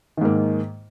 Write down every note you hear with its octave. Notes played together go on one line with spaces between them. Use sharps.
G#2 D#3 A#3